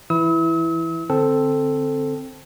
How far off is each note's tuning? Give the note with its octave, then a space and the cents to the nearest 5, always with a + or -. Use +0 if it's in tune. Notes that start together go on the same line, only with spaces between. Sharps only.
E3 +5 E4 +0 E6 -45
D3 +0 C4 +0 A4 +0